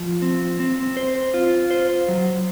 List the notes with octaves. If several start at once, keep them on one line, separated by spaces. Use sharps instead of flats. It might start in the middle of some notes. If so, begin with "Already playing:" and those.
Already playing: F3
C4
C4
C5
F4
C5
F#3